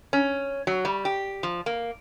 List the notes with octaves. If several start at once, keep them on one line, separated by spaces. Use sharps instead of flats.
C#4
F#3
G3
G4
F3
A#3